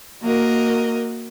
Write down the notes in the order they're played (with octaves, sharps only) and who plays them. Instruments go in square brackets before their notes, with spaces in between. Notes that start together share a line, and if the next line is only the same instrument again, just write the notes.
[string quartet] A#3 F#4 A#4 D#5